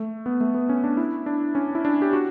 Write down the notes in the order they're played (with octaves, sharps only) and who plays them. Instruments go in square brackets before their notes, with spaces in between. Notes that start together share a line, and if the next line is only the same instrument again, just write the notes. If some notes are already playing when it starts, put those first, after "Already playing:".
Already playing: [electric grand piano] A3
B3
A3
B3
C#4
D4
E4
D4
C#4
E4
D4
G4
F#4